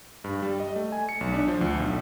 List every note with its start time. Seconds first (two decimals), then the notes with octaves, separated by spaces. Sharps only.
0.24 G2
0.42 G3
0.60 D#5
0.76 A3
0.92 G#5
1.09 C#7
1.21 B1
1.34 D4
1.48 F3
1.61 D2
1.80 B1